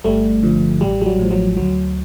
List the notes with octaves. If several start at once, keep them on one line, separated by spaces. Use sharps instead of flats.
G1 G3 A3
G2 D3 F3
A1 G3
G3
F#3
A2 F3
F#3
D2 F#3